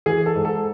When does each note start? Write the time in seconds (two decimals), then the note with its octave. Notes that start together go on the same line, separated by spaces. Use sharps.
0.06 E3 G#4
0.26 A4
0.35 G#2
0.45 A4